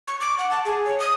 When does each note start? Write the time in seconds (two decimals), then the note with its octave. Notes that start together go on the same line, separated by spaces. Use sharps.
0.08 C#6
0.20 D6
0.38 F#5
0.51 A5
0.65 G#4
0.86 C#5
1.00 D#6